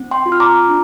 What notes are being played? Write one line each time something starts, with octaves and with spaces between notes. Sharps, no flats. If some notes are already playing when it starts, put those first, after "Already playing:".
Already playing: C4
G5 C6
F4
F6
A#5 D6
D4